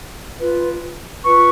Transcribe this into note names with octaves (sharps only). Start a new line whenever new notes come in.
F4 B4
F4 B4 C#6